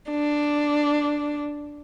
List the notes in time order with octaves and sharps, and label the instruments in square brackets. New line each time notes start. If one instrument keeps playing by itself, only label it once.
[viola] D4